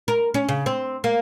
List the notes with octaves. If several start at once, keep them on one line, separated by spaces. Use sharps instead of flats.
A#4
C#4
C#3
C4
A#3